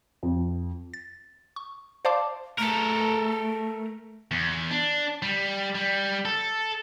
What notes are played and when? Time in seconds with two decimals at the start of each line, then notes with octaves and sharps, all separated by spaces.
0.23 F2
0.94 A6
1.56 C#6
2.05 C5 D5 F5 A5 C6 D6
2.58 A3 A4 A#4
4.31 E2
4.71 D4
5.23 G3
5.75 G3
6.25 A4